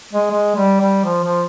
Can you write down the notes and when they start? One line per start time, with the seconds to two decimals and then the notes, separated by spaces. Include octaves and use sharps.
0.13 G#3
0.31 G#3
0.56 G3
0.80 G3
1.04 F3
1.24 F3